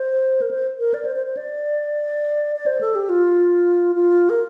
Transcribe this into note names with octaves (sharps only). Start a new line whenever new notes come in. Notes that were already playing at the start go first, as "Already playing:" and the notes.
Already playing: C5
A#4
C5
A#4
D5
C5
C5
C5
D5
D5
C5
A4
G4
F4
F4
A#4